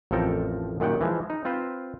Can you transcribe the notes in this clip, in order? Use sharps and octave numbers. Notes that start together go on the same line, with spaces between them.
A1 F2 F3 A4 A#4 G5
F#2 A#2 D#3 G3 F#5 G5
E3 F3 G#3
D#4
C4 F4 B4 C5